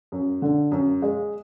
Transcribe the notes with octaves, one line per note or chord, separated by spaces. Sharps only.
F#2
D3
F#2
G#3